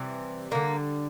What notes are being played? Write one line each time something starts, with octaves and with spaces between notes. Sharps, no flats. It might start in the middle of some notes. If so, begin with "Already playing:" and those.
Already playing: C3 E3 G3
D3 G3 A#3